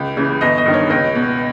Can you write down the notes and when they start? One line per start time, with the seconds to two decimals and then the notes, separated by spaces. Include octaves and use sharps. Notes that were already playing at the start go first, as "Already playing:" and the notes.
Already playing: C#2
0.17 C#3 E3
0.41 G1 D#5
0.58 D#5
0.66 G2 D#3
0.74 C#5
0.90 C#2 D#5
1.15 B2